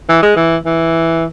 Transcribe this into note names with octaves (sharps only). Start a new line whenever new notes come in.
E3
G#3
E3
E3